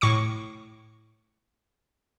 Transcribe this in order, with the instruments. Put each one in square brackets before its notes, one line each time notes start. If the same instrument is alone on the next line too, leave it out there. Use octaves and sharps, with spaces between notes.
[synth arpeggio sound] A2 C#6 D6 C#7